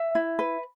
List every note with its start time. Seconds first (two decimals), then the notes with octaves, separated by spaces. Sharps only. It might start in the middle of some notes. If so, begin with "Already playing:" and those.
Already playing: E5
0.15 E4
0.39 B4